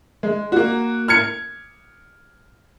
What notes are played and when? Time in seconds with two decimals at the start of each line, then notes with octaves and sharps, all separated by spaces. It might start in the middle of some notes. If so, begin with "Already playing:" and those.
0.23 G#3
0.52 A#3 F#4
1.08 F6 G#6 C#7